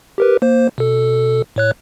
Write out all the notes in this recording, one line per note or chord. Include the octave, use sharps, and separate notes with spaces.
G4 A#4 B4
A#3 C5
B2 A4
A2 C#5 F#6